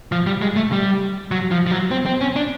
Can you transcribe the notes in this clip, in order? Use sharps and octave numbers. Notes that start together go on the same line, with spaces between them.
F3
G3
G#3
A3
G3
F#3
F3
F3
F#3
C4
C4
C#4
D4